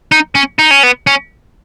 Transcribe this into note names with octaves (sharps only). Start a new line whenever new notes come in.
D#4
C#4
D#4
C#4
B3
C#4